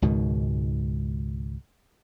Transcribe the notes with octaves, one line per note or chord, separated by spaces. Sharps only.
C#2 G#2 B2 D#3